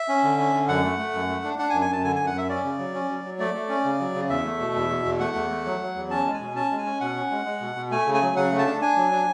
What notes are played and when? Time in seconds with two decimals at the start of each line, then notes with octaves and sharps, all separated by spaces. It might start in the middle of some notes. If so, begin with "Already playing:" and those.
Already playing: E5
0.08 C#4
0.24 D3
0.39 C#4
0.54 D3
0.68 F#2 F#5
0.84 A3
0.99 A3
1.14 F#2
1.29 A3
1.44 D4
1.59 D4 F#5
1.70 G#5
1.73 F#2
1.81 G#5
1.89 F#2 A5
2.04 D3 G#5
2.16 F#2 G#5
2.27 F#5
2.34 F#2 E5
2.49 C#4 D5
2.64 C#3
2.79 F#3
2.94 C#4
3.10 F#3
3.24 F#3
3.39 A3 D5
3.54 A3
3.69 C#4
3.85 C#3
4.00 F#3
4.14 C#3
4.30 E2 E5
4.45 A3
4.60 B2
4.75 E2
4.90 B2
5.05 E2
5.20 A3 F#5
5.35 E2
5.50 A3
5.66 F#3
5.80 F#3
5.95 E2
6.10 C#4 A5
6.26 G#3
6.33 G#5
6.41 B2
6.55 C#4 A5
6.71 G#3
6.78 G#5
6.86 C#4
7.00 B2 F#5
7.16 C#4
7.31 G#3
7.46 G#3
7.61 B2
7.76 B2
7.91 A3 G#5
8.06 C#3
8.14 G#5
8.22 F#3
8.36 C#3 F#5
8.51 A3
8.59 A5
8.66 D4
8.82 D4 G#5
8.96 F#3
9.11 D4